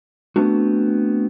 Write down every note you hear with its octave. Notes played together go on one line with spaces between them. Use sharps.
A3 B3 C4 D4 F#4